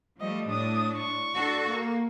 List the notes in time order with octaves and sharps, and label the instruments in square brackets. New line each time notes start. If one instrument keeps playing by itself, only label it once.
[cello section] F3 G3 A3 [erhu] D#5
[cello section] A2 D4 [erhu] D#6
[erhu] C#6
[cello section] D4 F#4 A4
A#3